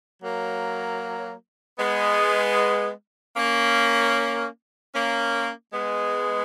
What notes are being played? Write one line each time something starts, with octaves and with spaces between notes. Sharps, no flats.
F#3 A#3
G#3 B3
A#3 C#4
A#3 C#4
G#3 B3